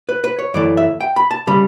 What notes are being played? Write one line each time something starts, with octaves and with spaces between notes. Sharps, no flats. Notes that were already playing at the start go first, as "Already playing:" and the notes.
B4
B4
C#5
F#2 E3 A3 D5
E5
G5
B5
A5
C#3 G3 B5